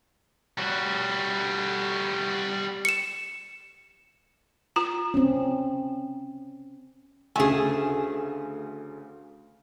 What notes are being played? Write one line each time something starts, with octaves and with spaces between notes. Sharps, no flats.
G3 F#4
C#7 E7
F4 A#5
C4 C#4
D2 C#3 A3 G#4 G#5